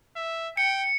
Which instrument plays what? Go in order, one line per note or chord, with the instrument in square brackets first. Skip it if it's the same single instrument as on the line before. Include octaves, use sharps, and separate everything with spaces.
[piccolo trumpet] E5
[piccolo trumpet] G5 [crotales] C#7